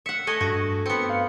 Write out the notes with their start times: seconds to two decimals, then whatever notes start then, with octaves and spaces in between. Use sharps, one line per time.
0.06 E5 F#5 C#7
0.27 A3 D#5 G#5
0.41 G2 F#4
0.86 B3 C4 C#7
1.10 F5